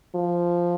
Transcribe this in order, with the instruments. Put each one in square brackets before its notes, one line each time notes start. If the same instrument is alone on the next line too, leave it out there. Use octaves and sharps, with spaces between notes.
[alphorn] F3